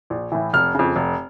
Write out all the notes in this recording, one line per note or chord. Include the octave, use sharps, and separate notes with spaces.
A#1
A2 E3
F1 F6
F2 C#3
F1